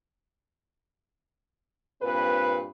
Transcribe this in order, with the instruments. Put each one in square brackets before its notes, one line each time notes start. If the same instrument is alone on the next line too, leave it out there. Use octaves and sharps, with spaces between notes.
[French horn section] G2 A#2 C4 B4